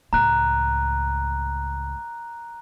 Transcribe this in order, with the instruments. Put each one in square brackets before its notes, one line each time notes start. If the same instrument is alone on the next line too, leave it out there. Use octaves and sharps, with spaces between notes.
[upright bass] C#2 A2 [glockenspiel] A#5 F#6